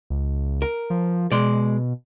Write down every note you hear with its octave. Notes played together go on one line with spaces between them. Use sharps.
C#2
A#4
F3
B2 G#3 D5